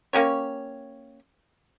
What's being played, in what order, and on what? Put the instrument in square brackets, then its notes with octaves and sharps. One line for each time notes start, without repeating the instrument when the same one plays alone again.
[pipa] A#3 C#4 G4 C#5